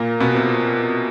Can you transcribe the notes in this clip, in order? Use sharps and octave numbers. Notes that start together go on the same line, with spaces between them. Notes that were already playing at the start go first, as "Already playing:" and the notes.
Already playing: A#2 A#3
B2 B3
C3 C4